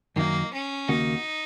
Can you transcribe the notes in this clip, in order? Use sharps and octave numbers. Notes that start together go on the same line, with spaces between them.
F#2 D#3 F#3 A#3 D#4
C#4
D#2 C#3 A#3 D#4 F#4